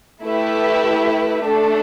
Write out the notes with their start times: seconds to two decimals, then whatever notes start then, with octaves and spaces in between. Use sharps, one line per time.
0.23 A3 E4 G4 B4 E5
1.44 A3 D4 A4